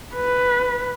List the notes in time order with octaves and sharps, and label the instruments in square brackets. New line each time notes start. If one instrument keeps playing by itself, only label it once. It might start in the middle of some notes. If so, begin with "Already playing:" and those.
[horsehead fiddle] B4